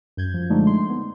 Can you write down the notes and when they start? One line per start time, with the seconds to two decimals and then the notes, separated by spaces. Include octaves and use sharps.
0.17 F#2 G6 G#6
0.34 F3
0.50 D3 F3 G#3 A3 D4 D#4
0.67 C6
0.89 B3